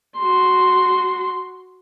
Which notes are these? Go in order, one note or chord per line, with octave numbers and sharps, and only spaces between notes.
F#4 C6